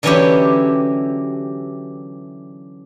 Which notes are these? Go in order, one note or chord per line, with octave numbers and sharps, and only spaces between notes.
D3 E3 F#3 C#4 E4 G4